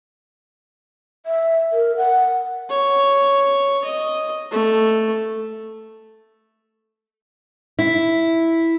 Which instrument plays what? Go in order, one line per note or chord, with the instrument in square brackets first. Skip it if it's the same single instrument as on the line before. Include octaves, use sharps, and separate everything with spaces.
[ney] E5
A#4
F#5
[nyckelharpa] C#5
D#5
A3
[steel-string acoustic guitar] E4